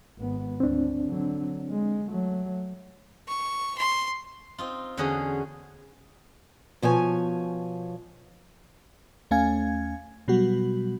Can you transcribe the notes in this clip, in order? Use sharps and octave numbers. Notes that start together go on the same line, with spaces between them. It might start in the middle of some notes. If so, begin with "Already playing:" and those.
G#1 B3
D2 C4 D4
D3 F#3
G#3
F#3 A3
C#6
C6
C4 D#4 F4
E2 D3 C#4 F#4 G#4
B2 F3 C#5 G#5
D#2 A3 C#4 F5 G#5 G#6
B2 F#3 G3 B3 F#4